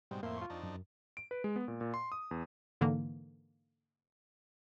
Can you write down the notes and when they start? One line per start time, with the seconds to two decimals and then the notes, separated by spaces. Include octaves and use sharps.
0.11 G#2 B2 G3 C4
0.23 F2 A2 A#3 E5 C6
0.38 F4 C#6
0.50 F2 D4 D#4
0.63 F#2
1.17 D7
1.31 B4
1.44 G#3
1.56 B3
1.68 A#2
1.81 A#2
1.94 C6
2.12 D#6
2.31 E2
2.81 G#2 D3 E3 A#3